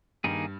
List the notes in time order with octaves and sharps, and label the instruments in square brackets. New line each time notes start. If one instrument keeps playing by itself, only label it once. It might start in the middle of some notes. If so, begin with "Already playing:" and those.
[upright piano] G2 [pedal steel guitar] D#3 A#3 D#4 G#4